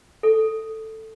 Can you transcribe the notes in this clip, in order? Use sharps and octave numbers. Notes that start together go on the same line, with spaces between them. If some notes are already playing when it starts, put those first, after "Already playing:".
A4